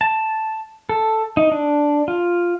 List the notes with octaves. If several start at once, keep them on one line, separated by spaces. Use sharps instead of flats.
A5
A4
D#4
D4
F4